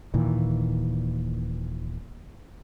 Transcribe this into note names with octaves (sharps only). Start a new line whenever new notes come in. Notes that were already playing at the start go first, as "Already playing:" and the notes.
D#1 A#2 D#3 E3